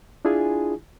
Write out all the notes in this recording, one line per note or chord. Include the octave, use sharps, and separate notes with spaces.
D4 E4 F4 G#4 G#5